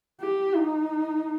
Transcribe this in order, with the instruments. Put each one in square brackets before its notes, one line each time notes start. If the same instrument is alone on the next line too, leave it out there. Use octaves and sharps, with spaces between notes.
[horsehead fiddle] G4
D#4